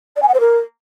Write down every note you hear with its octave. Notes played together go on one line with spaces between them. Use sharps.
D5
G#5
F#5
C5
A#4